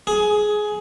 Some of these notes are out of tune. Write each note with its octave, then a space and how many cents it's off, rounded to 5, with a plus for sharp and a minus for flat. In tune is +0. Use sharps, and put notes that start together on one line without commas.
G#4 +15